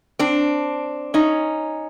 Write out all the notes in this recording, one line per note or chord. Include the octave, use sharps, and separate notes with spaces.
C4 D4
C#4 D#4